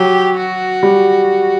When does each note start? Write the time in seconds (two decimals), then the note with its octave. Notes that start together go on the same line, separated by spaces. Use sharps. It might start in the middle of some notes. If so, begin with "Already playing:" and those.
Already playing: F#3 G4
0.37 F#4
0.83 G3